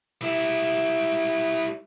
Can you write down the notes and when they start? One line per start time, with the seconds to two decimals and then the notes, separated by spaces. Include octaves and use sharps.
0.21 G3 E4